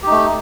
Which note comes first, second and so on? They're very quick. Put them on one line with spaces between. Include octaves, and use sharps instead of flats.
G4 D#4 A3